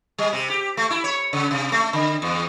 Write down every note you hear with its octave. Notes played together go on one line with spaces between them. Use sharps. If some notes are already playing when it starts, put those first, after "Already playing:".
G3
C3
G4
A3
E4
C#5
C#3
C3
A3
D3
E2